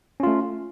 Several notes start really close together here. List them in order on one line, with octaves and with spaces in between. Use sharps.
C#4 F4 A3